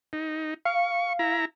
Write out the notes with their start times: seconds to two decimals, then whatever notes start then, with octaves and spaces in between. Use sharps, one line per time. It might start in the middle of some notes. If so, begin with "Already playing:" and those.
0.13 D#4
0.65 F5 C#6
1.19 E4 A#5